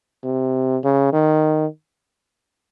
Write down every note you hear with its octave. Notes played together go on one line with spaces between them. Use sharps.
C3
C#3
D#3